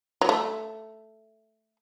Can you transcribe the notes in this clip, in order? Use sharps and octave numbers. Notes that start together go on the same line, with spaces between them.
F#3
A3